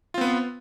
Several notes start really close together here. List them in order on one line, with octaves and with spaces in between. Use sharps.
F4 C4 B3